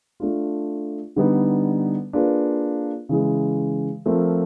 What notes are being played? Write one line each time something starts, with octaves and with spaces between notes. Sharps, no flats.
A3 D4 F4
D3 G3 B3 D#4
A#3 D4 F4 G#4 B4
C#3 E3 G#3
F3 A3 C4 F4 A#4